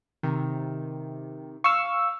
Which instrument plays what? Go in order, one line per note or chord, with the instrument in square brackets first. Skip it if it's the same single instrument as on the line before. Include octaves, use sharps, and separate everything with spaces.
[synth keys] C3 D#3
[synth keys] F5 [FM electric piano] C#6 E6